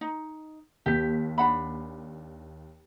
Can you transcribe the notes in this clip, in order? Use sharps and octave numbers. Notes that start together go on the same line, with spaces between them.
D#4
D#2 G4 B6
D4 F#5 B5